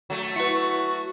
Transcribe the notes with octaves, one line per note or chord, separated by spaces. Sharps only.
F#3 A3
E4 F#4 B4 C#7